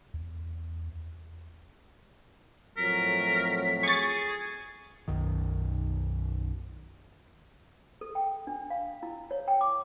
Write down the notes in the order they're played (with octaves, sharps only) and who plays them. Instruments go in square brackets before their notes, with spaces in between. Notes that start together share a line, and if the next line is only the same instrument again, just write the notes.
[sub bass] E2
[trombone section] F2 A2 F#3 [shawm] A#4 [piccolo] B6
[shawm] G#4 [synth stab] C#6 A6
[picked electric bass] B1 F#2 D#3
[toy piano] A4
G5
D4
F5
E4
C#5
G5
D6